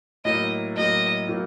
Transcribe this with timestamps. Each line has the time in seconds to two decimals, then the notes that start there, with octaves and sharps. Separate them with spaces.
0.25 A2 F#3 A#3 D#5
0.77 A2 F#3 A#3 D#5
1.28 A2 F#3 A#3